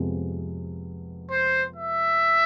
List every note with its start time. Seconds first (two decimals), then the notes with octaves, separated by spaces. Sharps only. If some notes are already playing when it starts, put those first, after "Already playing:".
Already playing: F2 C3 G#3 B3
1.31 C5
1.76 E5